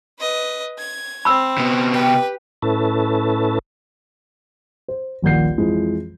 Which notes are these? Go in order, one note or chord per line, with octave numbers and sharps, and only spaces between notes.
B4 D#5
G#6
C4 B5 E6
C3 B3
G4 B4
A2 C#4 E4 A4 B4 A5
C5
D#1 A#1 D#2 F#5 G6 C7
F2 E3 F3 G#3